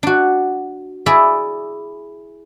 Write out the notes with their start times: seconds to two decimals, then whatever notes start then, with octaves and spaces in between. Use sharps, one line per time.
0.03 D4 F#4
1.06 E4 G#4 D5 E5